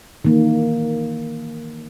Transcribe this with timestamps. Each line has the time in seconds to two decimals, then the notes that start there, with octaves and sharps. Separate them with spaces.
0.25 D#3 E3 A#3